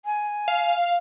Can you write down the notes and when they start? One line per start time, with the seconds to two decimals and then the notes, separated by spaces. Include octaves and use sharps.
0.05 G#5
0.48 F5